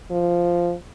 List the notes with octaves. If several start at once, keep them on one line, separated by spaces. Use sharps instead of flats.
F3